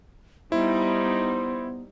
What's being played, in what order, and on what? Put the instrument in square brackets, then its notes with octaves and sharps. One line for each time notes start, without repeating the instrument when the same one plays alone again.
[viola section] G3 D#4 [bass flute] B3 [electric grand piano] E4 [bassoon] C5